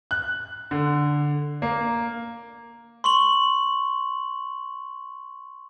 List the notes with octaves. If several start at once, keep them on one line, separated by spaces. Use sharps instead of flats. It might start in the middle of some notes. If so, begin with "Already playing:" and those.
F#6
D3
A#3
C6 C#6 F#7